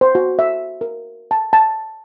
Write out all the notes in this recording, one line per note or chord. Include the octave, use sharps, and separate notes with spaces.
C5
F#4
E5
A#4
A5
A5